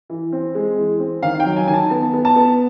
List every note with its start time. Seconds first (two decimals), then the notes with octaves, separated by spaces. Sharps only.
0.10 E3
0.32 C4
0.55 G#3
0.78 E3
1.00 C4
1.22 D#3 F5
1.40 G5
1.45 F#3
1.56 G#5
1.68 D#3 G#5
1.74 A5
1.90 B3 A5
2.13 B3
2.25 A5
2.36 B3